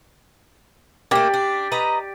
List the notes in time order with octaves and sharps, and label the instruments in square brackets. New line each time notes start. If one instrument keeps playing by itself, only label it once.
[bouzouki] A3 A#3 [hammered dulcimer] G4 D5
[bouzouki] D4
B4 D#5 A#5